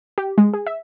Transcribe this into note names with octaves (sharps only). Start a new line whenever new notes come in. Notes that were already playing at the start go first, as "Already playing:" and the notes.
G4
G#3
G#4
E5